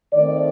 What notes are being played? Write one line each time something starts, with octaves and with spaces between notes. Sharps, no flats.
D#3 A3 C4 D5